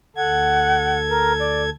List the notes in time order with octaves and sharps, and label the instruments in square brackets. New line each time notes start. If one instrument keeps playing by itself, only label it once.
[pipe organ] D2 A4 G#6 [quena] F#5
[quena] A#4
D5